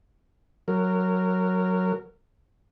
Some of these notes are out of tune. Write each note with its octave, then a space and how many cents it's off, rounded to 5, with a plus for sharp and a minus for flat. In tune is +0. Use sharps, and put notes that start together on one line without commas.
F#3 +0 A#4 -15